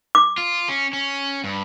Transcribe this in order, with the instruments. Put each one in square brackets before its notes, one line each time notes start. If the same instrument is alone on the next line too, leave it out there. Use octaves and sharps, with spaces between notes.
[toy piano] D6
[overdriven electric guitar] F4
C#4
C#4
G2